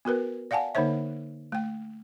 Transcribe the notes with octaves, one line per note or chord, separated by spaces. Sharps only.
B3 F#4 A#4 B4
D5 F5 F#5 G#5 A5
D3 A#3 D#4 C5 C#5 E5
A3 G5